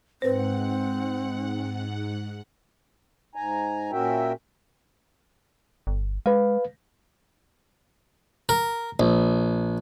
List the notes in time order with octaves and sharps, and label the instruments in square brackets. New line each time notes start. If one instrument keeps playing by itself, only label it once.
[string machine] G#2 F#5 [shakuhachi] C4 [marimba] B4 C5
[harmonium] G#2 G#5 A#5
A#2 C#4 F#4 A#4 E5 G5
[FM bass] G1
[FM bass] G#3 [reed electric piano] B4 F5
[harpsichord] A#4
A#1